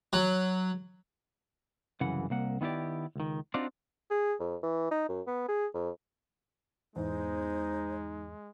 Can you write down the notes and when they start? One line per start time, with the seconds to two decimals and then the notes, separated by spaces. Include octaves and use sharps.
0.13 F#3
2.01 C2 F#2 C#3 E3 F#5
2.30 C2 A#3 F#5
2.61 D#3 B3 E4 G4 D5
3.16 C#2 D#3
3.54 C4 D4 D#4 F4 F#4 D5
4.10 G#4
4.40 F2
4.63 E3
4.91 D#4
5.09 F#2
5.27 B3
5.48 G#4
5.75 F2
6.96 E2 G#2 G#3 D#4 C5